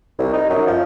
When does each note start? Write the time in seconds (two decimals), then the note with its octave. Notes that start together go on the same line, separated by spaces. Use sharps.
0.19 C2
0.33 D#4
0.50 F#2
0.67 F3